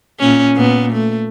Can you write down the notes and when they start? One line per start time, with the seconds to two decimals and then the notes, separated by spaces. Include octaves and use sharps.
0.19 A#2 C#4
0.55 A#2 B3
0.92 A3